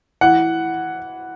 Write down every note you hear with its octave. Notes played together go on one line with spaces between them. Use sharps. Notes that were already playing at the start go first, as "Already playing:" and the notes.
E3 F#5